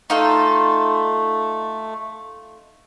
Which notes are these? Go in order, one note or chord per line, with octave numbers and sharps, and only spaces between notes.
A3 D#4 F4 A4